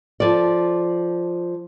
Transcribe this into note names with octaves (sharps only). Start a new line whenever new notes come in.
F3 A4 D5